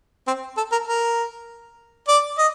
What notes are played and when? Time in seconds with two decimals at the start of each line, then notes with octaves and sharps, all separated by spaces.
0.27 C4
0.57 A4
0.72 A#4
0.87 A#4
2.08 D5
2.38 D#5